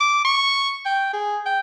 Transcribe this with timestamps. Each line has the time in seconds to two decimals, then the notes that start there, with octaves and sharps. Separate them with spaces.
0.01 D6
0.25 C#6
0.86 G5
1.13 G#4
1.46 G5